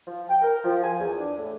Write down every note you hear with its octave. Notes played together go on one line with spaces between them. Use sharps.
F3
G5
A#4
F3
G#5
E2
D4
A2